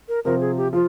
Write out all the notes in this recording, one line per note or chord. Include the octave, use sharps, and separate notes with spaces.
A#4
C3 F3 C4 A#4
G#4
G4
F3 F4